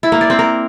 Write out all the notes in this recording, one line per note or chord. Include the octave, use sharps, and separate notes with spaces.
E4
A#3
D5
C4
A#4